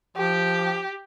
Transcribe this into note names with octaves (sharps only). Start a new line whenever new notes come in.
F3 G4